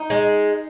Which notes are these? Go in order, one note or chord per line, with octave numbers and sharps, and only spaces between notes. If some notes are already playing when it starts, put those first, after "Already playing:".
Already playing: D#4
G#3